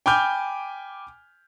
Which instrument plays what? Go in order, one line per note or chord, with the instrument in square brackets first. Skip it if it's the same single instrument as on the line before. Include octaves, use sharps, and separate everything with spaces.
[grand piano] G5 G#5 B5 D6 F6 G6